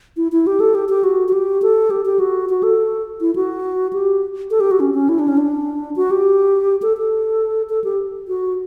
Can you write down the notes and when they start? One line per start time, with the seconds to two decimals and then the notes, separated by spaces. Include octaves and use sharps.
0.17 E4
0.32 E4
0.47 G4
0.60 A4
0.75 G4
0.89 G4
1.04 F#4
1.28 F#4
1.33 G4
1.62 A4
1.90 G4
2.05 G4
2.19 F#4
2.49 F#4
2.63 A4
3.21 E4
3.36 F#4
3.93 G4
4.51 A4
4.60 G4
4.71 F#4
4.80 C#4
4.94 C#4
5.09 E4
5.19 D4
5.28 C#4
5.37 D4
5.96 F#4
6.11 G4
6.82 A4
6.97 A4
7.70 A4
7.84 G4
8.28 F#4